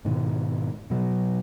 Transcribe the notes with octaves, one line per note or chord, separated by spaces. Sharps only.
G#2 B2 D#3
B2 F#3